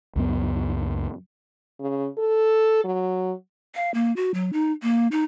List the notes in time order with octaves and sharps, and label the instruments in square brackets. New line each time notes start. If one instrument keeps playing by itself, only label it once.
[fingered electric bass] C#2 F#2 B3
[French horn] C#3
A4
F#3
[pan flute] F5
A#3
F#4
F#3
D#4
A#3
D#4